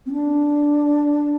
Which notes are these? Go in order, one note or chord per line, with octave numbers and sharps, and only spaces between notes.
C4
D4